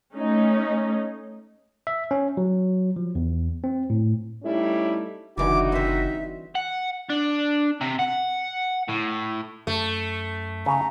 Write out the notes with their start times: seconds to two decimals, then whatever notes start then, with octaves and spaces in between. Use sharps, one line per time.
0.15 A3 C#4 D#4
1.87 E5
2.11 C#4
2.37 F#3
2.96 F3
3.15 E2
3.64 C4
3.90 A2
4.43 G3 A3 C#4 D#4 E4
5.38 F#1 D3 E3 G3 D#4 F#4 D6
5.72 C4 C5 E5
6.55 F#5
7.09 D4
7.81 C3
7.99 F#5
8.89 A2
9.67 F#2 A3
10.66 C#3 A#5